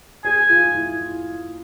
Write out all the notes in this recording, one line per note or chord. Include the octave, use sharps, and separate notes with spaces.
G#4 G#5
F4
E4